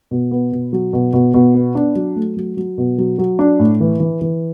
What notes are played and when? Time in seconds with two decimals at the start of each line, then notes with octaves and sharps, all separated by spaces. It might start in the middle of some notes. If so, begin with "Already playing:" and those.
0.11 B2
0.31 B3
0.52 B2
0.73 F#3
0.93 B2
1.13 B2
1.34 B2
1.54 B3
1.75 D4
1.95 F#3
2.16 A3
2.37 F#3
2.57 F#3
2.78 B2
2.98 F#3
3.18 F#3
3.39 D4
3.59 A2
3.80 E3
4.00 E3
4.21 E3